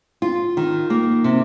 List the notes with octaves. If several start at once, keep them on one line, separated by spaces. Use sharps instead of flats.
F4
D#3
A#3
C3